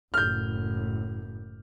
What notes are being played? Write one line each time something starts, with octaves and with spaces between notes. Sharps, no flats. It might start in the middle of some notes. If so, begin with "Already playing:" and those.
F#1 A2 F6 G6